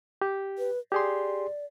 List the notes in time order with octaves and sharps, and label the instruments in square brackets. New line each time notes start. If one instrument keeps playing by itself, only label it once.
[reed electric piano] G4
[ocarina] B4
[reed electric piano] G4 G#4 C6 [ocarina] D5